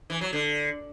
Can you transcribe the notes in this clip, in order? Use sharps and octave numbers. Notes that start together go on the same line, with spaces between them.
E3
F#3
D3